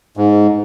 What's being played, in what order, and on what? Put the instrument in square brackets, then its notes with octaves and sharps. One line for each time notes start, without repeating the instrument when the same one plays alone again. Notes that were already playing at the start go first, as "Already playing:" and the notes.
[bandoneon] G#2